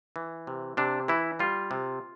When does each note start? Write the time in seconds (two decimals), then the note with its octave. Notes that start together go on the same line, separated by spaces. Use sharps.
0.16 E3
0.47 C3
0.77 C3 D4
1.08 E3 E4
1.39 G3 F4
1.71 C3